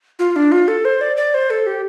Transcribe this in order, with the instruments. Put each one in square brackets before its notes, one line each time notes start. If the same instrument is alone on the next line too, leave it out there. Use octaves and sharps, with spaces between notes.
[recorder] F4
D4
F4
A4
C5
D5
D5
C5
A4
G4